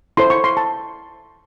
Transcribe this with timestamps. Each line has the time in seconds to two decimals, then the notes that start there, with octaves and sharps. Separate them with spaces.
0.17 E4 A4 C5 C6
0.30 C#6
0.44 C6
0.57 A5